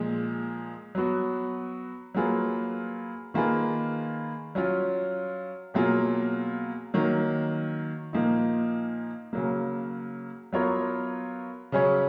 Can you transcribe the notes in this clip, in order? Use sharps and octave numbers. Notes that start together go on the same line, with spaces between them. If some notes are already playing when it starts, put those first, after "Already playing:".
Already playing: A#2 F3 G#3
F#3 B3 F#4
F#3 A#3 F4 G#4 B4
D#3 A#3 F4 G#4 B4
F#3 C#4 F4
B2 F#3 A#3 F4 G#4
D#3 F#3 A#3
A#2 F3 A#3 D#4
C#3 F#3 A#3
F#3 B3 F4 A#4 C#5
C#3 F#3 C#4 G#4 C#5